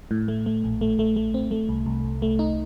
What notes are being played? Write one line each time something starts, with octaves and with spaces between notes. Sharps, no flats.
A2
A3
A3
A#1
A3
A3
A3
C4
A3
C2
C2
C2
A3
D#4